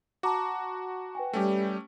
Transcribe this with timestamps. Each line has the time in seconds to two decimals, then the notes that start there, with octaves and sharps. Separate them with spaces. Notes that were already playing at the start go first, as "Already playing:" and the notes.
0.23 F#4 A5 A#5 D6
1.15 B4 G5 G#5
1.33 G3 A3 C#4 G4